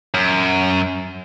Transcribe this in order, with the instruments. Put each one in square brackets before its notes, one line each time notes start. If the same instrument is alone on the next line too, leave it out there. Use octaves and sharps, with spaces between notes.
[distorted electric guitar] F#2